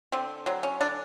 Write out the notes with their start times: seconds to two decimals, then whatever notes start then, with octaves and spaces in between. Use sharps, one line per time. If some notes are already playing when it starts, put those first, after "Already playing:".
0.12 D3 C4
0.46 F#3 C4
0.63 C#4
0.81 D3 D4